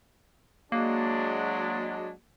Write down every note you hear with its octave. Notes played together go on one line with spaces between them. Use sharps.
F#3 G#3 A#3 D4